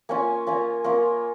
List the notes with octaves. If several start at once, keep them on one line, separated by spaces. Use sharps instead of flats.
A#3 C#4 F4 G#5
A#3 C#4 F4
A#3 C#4 F4